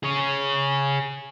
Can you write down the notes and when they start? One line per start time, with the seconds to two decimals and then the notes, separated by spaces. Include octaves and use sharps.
0.03 G#4 C#5